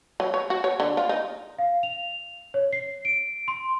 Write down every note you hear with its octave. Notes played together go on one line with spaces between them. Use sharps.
F#3
C#5
F#4
C#5
D3
F4
D#4
F5
F7
C#5
C7
D7
C6